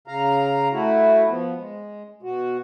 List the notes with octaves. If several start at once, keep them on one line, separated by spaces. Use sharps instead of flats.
C#3 F5 A#5
A3 E4 F#4
F3 B3
G#3
B2 F#4